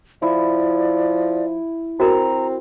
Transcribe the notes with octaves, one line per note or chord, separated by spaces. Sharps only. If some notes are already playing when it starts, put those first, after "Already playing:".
F3 E4 D5
C4 F#4 A#4 A#5